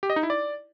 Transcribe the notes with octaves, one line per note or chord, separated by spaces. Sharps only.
G4
D#5
D#4
E4
D5